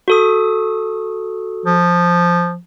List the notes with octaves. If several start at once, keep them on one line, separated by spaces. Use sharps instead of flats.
F#4 A4 D#6
F3